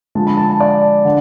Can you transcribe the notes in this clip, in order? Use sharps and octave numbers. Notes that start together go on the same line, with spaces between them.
D3 F3 G#3 A5
B5
A5
A5
D5
D3